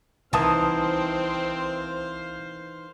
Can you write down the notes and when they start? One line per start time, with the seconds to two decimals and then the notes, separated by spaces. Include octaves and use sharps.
0.33 C2 D#3 E3 C4 C5 F5 A5 D#6